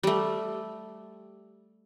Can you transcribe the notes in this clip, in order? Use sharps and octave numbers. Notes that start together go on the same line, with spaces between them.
G3 A3